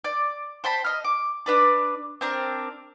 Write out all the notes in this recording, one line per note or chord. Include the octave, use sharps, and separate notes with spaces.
D5
C5 G5 A5 B5
D#5 F6
D6
D4 B4 D5
C4 D4 A#4